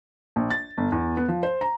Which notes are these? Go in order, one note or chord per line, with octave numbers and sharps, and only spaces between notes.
A#1
A6
G1
E2
B3
F3
C5
A#5